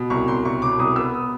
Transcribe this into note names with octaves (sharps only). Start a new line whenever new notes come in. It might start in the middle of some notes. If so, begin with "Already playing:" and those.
Already playing: B2
C2 C#6
C2 C6
C2 C#6
B2 D6
C2 D#6
B3 E6
D#6